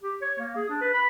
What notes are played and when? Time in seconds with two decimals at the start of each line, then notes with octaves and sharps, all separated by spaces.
0.03 G4
0.21 C#5
0.39 A#3
0.56 G#4
0.69 D4
0.81 B4
0.94 B5